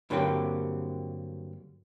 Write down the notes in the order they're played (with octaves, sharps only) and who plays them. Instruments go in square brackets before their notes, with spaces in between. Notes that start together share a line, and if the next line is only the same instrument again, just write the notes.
[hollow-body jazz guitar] G2 D3 F#3 A#3 C4 G4